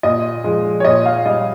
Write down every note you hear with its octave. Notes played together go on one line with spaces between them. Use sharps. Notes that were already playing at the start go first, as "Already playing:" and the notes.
A#2 D#5
F3 G#3
C#5
A#2 D#5
F5
G3 D#5